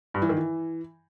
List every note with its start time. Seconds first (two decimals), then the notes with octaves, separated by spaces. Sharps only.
0.14 G2
0.22 E3
0.29 D#3
0.37 E3